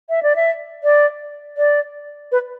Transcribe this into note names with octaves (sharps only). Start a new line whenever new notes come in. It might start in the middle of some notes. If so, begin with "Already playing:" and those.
E5
D5
E5
D5
D5
B4